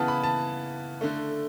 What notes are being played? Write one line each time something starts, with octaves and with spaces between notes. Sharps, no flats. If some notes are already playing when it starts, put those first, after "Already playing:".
Already playing: C#3 E3 B3 F#5 A5
B5
A5
D3 A3